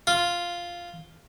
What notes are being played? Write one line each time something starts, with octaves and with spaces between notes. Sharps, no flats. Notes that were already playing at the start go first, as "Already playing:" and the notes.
F4